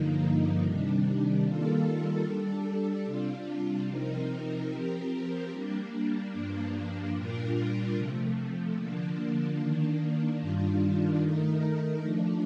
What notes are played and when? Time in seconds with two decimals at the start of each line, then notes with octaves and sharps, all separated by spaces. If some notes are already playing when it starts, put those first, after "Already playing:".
Already playing: G2 D3 F3 A#3 D#4
0.61 C3 D#3 G3 D4
1.42 D#3 G3 A#3 F4 A4
2.24 G3 D4 A4
3.05 C3 G3 D4 F4
3.87 C3 F3 C4 D#4 A#4
4.68 F3 C4 G4 A#4
5.50 G3 A#3 D4
6.32 G2 F3 A#3 D4
7.13 A#2 G3 D4 F4 A#4
7.95 C3 F3 A3
8.76 D3 F3 A#3 D4
9.57 D#3 A#3 D4
10.39 G2 D#3 G3 D4 F4
11.20 D#3 A3 D#4 A#4
12.02 F3 A3 D4